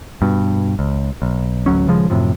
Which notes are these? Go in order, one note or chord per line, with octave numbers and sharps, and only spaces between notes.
G2 B2
C#2
B1
A1 D2 F#3 C#4
D#1 C#3 F3 G#3
F#2 A2 C3 F3